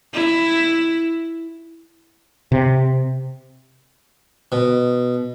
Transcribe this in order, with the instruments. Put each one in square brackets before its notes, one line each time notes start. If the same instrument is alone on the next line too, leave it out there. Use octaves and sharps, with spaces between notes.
[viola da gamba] E4
[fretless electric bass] C3
[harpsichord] B2